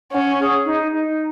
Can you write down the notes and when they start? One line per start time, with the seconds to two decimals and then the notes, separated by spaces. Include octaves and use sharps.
0.12 C#4 F#5
0.40 G#4
0.66 D#4
0.92 D#4